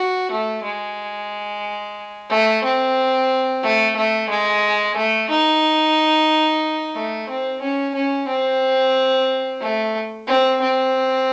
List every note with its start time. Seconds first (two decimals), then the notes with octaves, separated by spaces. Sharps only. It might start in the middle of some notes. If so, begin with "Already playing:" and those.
Already playing: F#4
0.31 A3
0.64 G#3
2.30 A3
2.64 C4
3.63 A3
3.96 A3
4.29 G#3
4.96 A3
5.29 D#4
6.95 A3
7.29 C4
7.61 C#4
7.95 C#4
8.28 C4
9.61 A3
10.27 C4
10.61 C4